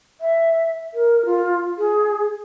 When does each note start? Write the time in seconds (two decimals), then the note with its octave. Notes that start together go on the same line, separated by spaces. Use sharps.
0.21 E5
0.94 A#4
1.26 F4
1.78 G#4